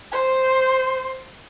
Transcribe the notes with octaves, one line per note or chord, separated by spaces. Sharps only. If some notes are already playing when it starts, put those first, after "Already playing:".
C5